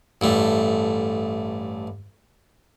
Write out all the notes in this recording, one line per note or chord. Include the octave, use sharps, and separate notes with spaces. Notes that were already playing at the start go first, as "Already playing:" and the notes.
A1 G2 A3